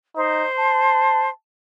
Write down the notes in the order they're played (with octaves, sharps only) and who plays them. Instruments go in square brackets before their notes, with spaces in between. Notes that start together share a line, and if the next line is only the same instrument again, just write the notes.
[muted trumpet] D#4 [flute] C5
[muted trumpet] A5